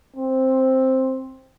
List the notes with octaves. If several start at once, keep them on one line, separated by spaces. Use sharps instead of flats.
C4